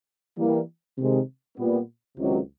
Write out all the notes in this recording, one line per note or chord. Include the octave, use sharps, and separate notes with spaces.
E3 G3 A#3
C3 D#3 G#3
A#2 G3 B3
C#2 C3 D#3 F#3